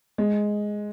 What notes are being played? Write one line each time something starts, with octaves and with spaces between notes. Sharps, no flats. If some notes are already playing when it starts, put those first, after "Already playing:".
G#3